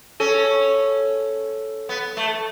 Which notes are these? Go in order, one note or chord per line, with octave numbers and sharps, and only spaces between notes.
C#4 A4
B3
A3